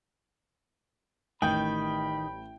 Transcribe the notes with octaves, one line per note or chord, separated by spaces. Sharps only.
A1 D#3 G3 G5 B5 G6